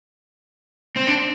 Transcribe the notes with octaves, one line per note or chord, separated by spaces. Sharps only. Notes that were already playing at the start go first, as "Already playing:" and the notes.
C4
D4